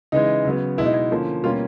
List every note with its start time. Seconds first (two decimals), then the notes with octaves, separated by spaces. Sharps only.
0.12 C#3 E3 G#3 D#4
0.45 C#3 F#3 B3
0.78 B2 G#3 B3 E4
0.86 D#4
0.94 E4
1.11 D3 F3 A#3 C#4
1.44 B2 G3 A#3 C#4 F4